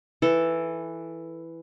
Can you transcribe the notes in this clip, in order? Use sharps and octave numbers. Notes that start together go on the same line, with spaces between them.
E3 A4